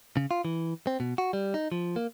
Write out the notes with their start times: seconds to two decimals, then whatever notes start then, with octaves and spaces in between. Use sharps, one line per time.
0.17 C#3
0.31 F4
0.45 E3
0.87 C4
1.00 B2
1.18 F#4
1.33 G3
1.54 D#4
1.72 F3
1.96 A#3